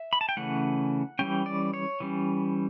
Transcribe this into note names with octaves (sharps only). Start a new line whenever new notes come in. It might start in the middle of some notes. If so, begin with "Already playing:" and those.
Already playing: E5
B5
A5
G5
C#3 E3 A3 C#4 F#5
E3 G3 C#4 G5
D5
C#5
E3 G3 C#4